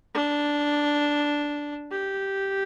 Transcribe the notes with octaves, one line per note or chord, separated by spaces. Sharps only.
D4
G4